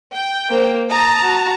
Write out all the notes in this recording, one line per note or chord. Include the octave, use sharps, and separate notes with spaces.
G5
A#3 C5
A5 A#5 D#6
F#4